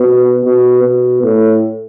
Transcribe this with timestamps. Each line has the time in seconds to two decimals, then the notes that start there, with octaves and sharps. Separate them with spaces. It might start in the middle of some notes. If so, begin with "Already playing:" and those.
Already playing: B2
0.44 B2
0.83 B2
1.23 A2